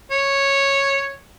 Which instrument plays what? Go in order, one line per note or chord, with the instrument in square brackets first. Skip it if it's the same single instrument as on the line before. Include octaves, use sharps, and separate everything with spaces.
[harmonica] C#5